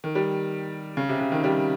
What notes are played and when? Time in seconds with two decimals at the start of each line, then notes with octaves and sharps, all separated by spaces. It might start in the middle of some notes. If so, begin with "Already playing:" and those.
0.04 D#3
0.15 G3
0.97 C#3
1.09 C3
1.20 C#3
1.32 D#3
1.44 G3